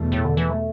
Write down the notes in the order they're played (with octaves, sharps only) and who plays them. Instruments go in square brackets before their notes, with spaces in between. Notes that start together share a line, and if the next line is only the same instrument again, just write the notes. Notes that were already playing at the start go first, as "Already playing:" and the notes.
Already playing: [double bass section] E2 B2 A3
[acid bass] A2
D3
E3
A3